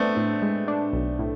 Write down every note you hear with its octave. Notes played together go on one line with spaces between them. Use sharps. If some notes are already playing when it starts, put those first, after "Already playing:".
Already playing: A3 B3 C4 D4
A2
G#3
D4
B1
A2